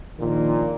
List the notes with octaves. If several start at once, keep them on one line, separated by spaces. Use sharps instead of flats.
A#1 A#2 D#3